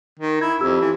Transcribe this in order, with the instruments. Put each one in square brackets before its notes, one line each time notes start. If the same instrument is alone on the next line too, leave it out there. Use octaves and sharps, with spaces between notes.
[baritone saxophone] D#3
[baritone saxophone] E4 [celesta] G#6
[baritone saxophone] F2 [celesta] G4 E6
[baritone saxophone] E3